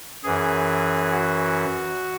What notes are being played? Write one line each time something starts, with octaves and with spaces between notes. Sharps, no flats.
F#2 E3 G#4
F#4